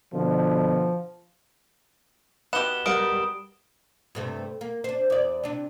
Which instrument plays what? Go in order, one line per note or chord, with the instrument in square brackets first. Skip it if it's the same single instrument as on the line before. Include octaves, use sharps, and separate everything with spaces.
[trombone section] B2 D3 [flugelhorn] F3
[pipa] B2 B3 [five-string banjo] G4 F#5 [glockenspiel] E7 G7
[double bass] G3 [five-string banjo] A#4 F#5 [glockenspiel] D#6 D7
[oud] G2 C3 A3
A#3
D4 C5
E2 D5
C3 D4